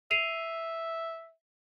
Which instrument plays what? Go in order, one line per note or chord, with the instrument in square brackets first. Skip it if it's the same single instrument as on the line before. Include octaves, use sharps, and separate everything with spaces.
[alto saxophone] E5 [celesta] C7 D#7 F7